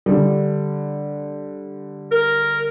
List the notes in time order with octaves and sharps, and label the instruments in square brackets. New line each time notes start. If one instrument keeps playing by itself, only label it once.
[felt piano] D3 G3
[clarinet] A#4